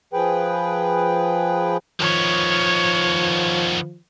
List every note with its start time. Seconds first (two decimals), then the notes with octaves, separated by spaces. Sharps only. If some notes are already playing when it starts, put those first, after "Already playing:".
0.13 F3 G#4 B4 G5
2.01 D#3 F3 B3 C#5